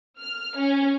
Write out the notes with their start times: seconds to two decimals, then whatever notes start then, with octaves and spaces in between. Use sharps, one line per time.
0.19 F6
0.57 C#4